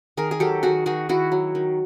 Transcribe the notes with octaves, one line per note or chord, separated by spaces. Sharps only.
D#3 G#4 A#4
G#4
F#3 G4 A4
D#3 F#4 G#4
D#3 F#4 G#4
D#3 E4 F#4
F#3
D#3